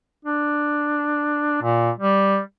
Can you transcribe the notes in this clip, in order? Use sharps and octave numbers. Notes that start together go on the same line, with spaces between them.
D4
A#2
G3